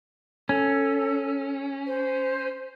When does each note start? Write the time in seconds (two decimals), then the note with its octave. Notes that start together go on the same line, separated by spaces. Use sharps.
0.49 C#4 A4
1.87 C5